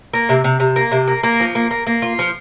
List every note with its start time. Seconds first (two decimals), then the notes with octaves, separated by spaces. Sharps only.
0.14 A#3
0.29 C3
0.44 C3
0.60 C3
0.76 A#3
0.91 C3
1.08 A#3
1.23 A#3
1.40 F3
1.55 A#3
1.71 A#3
1.87 A#3
2.02 F4
2.19 F3